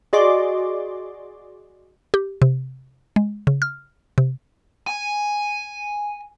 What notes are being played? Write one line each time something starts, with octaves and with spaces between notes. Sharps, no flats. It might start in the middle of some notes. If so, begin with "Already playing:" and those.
F#4 G#4 D5 D#5 C6 D6
G4
C3
G#3
C#3
F6
C3
G#5